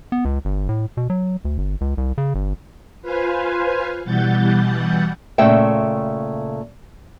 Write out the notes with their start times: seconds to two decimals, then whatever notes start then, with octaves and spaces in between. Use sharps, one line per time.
0.12 B3
0.25 C#2
0.45 G1
0.69 A2
0.97 B2
1.10 F#3
1.45 D2
1.58 G1
1.81 C#2
1.97 C2
2.18 C#3
2.35 G1
3.02 F4 B4 C5 F5 G#5
4.04 B2 E3 G3 F#5 G6 A6
5.38 A#2 C#3 A3 E5 G5